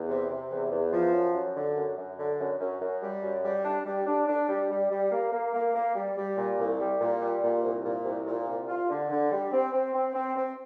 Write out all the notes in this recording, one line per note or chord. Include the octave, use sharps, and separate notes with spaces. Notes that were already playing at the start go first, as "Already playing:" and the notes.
Already playing: E2
C3
C3
E2
E2
F3
F#2
F#2
D3
F#2
F#2
D3
F#2
F#2
F#2
G3
F#2
G3
D4
G3
D4
D4
G3
G3
G3
A#3
A#3
A#3
A#3
G3
G3
A#2
C2
G3
A#2
G3
A#2
C2
A#2
C2
A#2
C2
F4
D3
D3
G3
C4
C4
C4
C4
C4